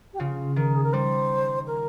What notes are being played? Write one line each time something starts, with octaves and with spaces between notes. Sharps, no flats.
G4
C#3 F4
D#3 A#4
G#4
A#4
G3 C5
A#4